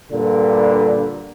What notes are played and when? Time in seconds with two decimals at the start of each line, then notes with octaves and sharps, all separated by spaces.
0.12 G2 A#2 D3